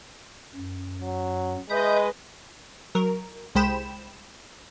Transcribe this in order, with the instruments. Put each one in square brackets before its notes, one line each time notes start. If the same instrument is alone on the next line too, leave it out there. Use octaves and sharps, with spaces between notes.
[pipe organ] F#2
[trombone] F#3
[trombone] G#3 [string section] B4 D#5 [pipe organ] E5 D#6 G6
[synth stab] F#3 A#4
C2 G#3 C5 G5 B5 E7